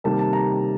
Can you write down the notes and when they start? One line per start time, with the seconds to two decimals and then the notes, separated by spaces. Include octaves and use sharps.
0.04 C3 D#3 G3 A#3 A5
0.19 A5
0.33 A#5